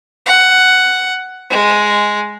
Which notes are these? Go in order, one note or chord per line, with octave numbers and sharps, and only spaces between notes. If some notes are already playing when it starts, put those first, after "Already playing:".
F#5
G#3